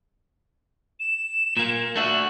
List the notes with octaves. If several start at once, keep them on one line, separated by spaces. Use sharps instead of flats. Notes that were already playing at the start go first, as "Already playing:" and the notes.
E7
A#2 A#3
A3 D4 F#4 E5